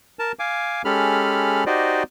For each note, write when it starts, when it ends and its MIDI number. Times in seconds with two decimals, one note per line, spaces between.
0.19 0.32 70
0.19 0.32 81
0.39 0.82 77
0.39 0.82 80
0.39 0.82 86
0.85 1.64 56
0.85 1.64 61
0.85 1.64 67
0.85 1.64 69
0.85 1.64 83
0.85 1.64 89
1.66 2.03 63
1.66 2.03 66
1.66 2.03 67
1.66 2.03 72
1.66 2.03 74
1.66 2.03 75